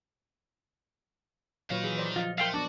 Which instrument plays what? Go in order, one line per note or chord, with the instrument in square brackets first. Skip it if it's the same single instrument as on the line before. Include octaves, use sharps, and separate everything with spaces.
[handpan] A#2 F#3 F4 [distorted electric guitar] D#3 D#4 [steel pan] B4 C#5 F5
[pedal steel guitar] E3 [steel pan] G#4
[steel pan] C5 D5
[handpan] F3 D#5 [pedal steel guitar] F4
[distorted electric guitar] A3 [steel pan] A#4 E6 [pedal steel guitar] F5 G5 C6
[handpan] B3 D4 [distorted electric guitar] F#4 [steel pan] A5 [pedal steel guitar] D6